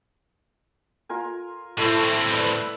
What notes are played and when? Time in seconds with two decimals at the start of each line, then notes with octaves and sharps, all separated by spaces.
1.09 F4 A#4 G#5
1.78 A2 A3 C4 E4 A4
2.31 B4 D5 B5